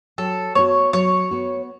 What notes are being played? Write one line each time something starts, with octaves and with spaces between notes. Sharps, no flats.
F#3 A4
B3 F#4 C#5
F#3 C#5
B3 F#4